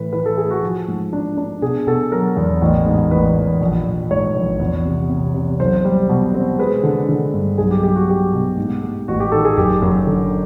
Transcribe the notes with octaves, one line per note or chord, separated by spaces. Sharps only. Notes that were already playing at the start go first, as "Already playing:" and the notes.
Already playing: A2 E3 B4
E3 B4
A4
A3 G#4
F#4
F3
G#2
D4
D4
B2 G#4
B2 A4
F#3 A#4
E2
A1
G#2
A1 B4
A1
A#1
A#1
G#2 C#5
A#1
E2
C3
C3
C3
B1 C5
G3
B2
C4
G#3 B4
D3
D3
G2
B1 G#4
G4
B1 G4
F#4
G3 G4
B2
G#2
G#2
A1 F#4
G4
D#3 A4
G#4
F#1 G4
F#2
D3